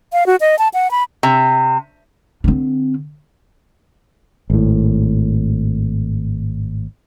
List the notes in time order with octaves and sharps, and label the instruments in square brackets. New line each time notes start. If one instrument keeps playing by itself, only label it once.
[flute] F5
F#4
D#5
A5
F#5
B5
[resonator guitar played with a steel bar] C3
[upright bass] D3 C4
[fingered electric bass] G#1 A2